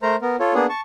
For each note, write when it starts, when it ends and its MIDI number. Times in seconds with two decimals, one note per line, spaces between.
0.02 0.16 57
0.02 0.16 70
0.02 0.16 72
0.02 0.16 82
0.22 0.36 59
0.22 0.36 70
0.40 0.54 65
0.40 0.54 69
0.40 0.54 73
0.54 0.66 58
0.54 0.66 59
0.54 0.66 62
0.54 0.66 68
0.69 0.81 81
0.69 0.81 85